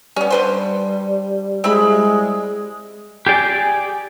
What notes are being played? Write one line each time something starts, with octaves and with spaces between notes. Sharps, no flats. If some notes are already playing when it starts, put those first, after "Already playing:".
G3 B3 C#4
D3 B4 C5
G#3 C4 E4 B5
G4 G#4 D5